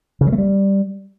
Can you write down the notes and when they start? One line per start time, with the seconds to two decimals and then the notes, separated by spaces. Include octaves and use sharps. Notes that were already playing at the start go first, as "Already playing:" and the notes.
0.21 C#3
0.27 F#3
0.32 A3
0.38 G3